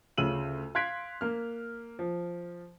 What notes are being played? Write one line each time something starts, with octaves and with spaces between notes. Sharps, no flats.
D2 C#3 F4 E6 D#7 F#7
F5 C6 F#6 G#6 B6 D7
A#3 F6
F3